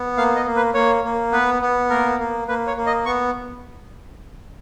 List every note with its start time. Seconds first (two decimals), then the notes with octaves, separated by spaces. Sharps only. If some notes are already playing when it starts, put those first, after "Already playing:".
Already playing: B3
0.17 A#3 F5
0.36 D#5
0.46 A#3
0.56 B4
0.74 A#3 C#5
1.04 A#3
1.32 B3 B4
1.62 B3
1.90 A#3 A#4
2.19 A#3
2.48 A#3 B4
2.67 C#5
2.77 A#3
2.87 D#5
3.05 B3 C#6